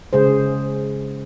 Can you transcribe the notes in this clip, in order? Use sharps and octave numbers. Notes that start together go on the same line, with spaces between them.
C#3 G#3 G#4 C5